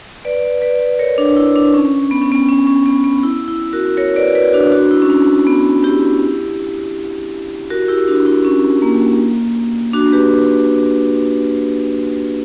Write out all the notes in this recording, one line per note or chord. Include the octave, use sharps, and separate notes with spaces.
B4 D5
B4 D5
A#4 C#5
D4
E4
D4
C#4
B3
C#4
B3
C#4
C#4
B3
B3
E4
E4
F#4 A#4
A#4 C#5
B4 D5
B4 D5
D4 F#4
D4 F#4
E4
C#4
D4
B3
E4 G4
F#4 A#4
E4 G4
D4 F#4
E4
C#4
A#3
D4 F#4
G4 B4